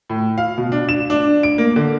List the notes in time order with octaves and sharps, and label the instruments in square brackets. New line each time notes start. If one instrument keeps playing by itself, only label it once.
[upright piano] A2
F5
B2
D4
E7
D4
D7
A#3
D3